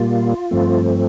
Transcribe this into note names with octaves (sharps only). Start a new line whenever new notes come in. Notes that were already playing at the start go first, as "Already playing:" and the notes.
Already playing: A#2 G3 A#3 F4
G2 F3 A3 C4